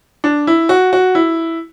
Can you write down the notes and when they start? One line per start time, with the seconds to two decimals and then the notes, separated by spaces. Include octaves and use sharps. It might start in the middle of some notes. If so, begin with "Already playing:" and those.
0.24 D4
0.47 E4
0.69 F#4
0.93 F#4
1.15 E4